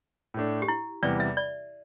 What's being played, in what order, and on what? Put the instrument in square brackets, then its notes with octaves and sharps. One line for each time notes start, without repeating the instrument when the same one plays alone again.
[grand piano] A2 A3 D4
[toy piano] G4
E4
[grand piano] E2 C3 E3 G3 [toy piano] D5
[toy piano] E5
D5